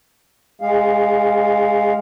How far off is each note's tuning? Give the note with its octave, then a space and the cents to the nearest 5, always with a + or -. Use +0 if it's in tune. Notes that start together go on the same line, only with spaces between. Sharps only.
G#3 +0 G#4 -35 F5 +0